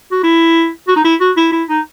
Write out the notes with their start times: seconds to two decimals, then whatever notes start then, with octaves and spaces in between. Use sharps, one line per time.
0.11 F#4
0.23 E4
0.88 F#4
0.96 D#4
1.04 E4
1.20 F#4
1.37 E4
1.52 E4
1.68 D#4